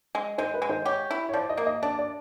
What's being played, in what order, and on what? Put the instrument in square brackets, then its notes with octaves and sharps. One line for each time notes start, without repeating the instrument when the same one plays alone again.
[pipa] G#3
[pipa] G#3 [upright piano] C5
[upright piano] B4
[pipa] G#3
[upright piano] C5
[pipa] G4 [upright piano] C#5
[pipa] E4
[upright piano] C#5
[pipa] F3 [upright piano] D5
[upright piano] D#5
[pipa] A#3
[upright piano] D#5
[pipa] D4 [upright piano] D5
[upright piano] D5